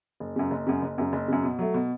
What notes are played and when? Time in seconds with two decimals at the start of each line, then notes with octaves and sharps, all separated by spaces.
0.20 F#1
0.36 F#2 C#3
0.51 F#1
0.67 F#2 C#3
0.82 F#1
0.98 F#2 C#3
1.13 F#1
1.28 F#2 C#3
1.43 B2
1.59 F#3 A3
1.74 B2